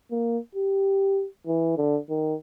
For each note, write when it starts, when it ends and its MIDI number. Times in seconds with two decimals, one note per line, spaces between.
0.11 0.38 58
0.55 1.25 67
1.47 1.73 52
1.77 1.97 50
2.09 2.34 51